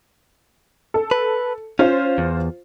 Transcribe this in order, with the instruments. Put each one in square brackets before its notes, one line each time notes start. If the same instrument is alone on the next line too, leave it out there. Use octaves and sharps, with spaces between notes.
[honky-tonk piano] A4
[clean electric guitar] B4
[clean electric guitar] C#4 [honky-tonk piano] F4 C5
[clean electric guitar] E2